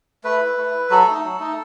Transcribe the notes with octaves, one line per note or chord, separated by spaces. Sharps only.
A3 B4
E4
A3
E4
F#3 A4
A3 D#4
F#3
A3 D#4